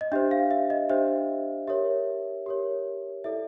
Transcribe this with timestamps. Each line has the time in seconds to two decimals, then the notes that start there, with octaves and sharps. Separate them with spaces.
0.01 D#5
0.12 D4 G4 C5 E5
0.31 F5
0.51 E5
0.70 D#5
0.89 D4 G4 C5 E5
1.68 G4 A#4 C#5 E5
2.46 G4 A#4 C#5
3.24 E4 A4 D5 E5